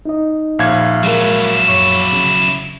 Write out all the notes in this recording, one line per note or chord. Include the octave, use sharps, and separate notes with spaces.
D#4 D#5
A#1 F5 G#6
F#3 G#3 E4 A#4
F#2 C#5 C#6
C#3